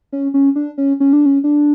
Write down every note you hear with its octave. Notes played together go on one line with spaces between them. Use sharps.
C#4
C#4
D4
C#4
C#4
D4
C#4
D4